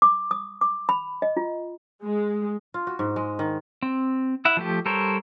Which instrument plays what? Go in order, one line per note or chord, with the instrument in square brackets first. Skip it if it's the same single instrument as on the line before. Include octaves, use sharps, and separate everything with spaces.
[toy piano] D6
D#6
D6
B5
D#5
F4
[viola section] G#3
[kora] F4
F#4
G#2
G#3
D#3
[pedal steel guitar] C4
E4 E5 F#5
F3 A3 G4
G3 A4 A#4 C5 C#5